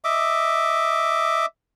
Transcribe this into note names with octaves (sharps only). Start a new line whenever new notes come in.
D#5 E5 D6